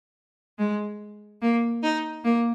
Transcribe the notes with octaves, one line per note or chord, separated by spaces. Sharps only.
G#3
A#3
D#4
A#3